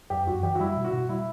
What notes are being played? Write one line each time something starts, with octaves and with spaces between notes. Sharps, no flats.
F#2 G4
F#2 F#4
E3 G4
F#4
G3 E4
B2
F#4
B2
G3 E4